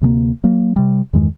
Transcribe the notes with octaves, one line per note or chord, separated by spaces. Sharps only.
D2 C3 G3 A#3
F#3 A#3
C3 G3
E2 G2 D#3 G#3